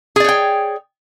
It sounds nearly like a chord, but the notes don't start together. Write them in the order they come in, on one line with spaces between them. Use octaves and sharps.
G#4 D5 C#5 G5